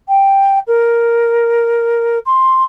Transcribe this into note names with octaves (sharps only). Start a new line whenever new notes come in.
G5
A#4
C6